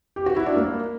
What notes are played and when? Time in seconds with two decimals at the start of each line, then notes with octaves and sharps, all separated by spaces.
0.16 G4
0.26 F#4
0.36 E4
0.46 D4
0.56 A#3